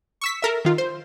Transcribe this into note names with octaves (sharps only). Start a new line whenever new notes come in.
C#6 E6 B6
A4 A#4 E5
D#3 F4
C5